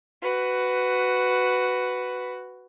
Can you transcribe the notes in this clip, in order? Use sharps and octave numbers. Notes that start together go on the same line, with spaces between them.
F#4 B4